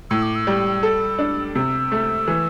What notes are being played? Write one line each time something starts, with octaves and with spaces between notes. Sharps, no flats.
A2 E6
D6
E6
G3
A4
D4
C3 E6
A3
E3